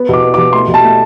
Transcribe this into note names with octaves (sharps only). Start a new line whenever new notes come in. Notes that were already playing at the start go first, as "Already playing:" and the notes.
Already playing: B3
B2 D6
B3
D6
B2
A3 C6
B2
A5
A3